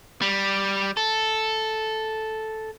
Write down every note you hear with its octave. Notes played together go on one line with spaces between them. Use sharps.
G3
A4